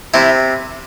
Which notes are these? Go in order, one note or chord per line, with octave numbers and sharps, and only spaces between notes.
C3 E4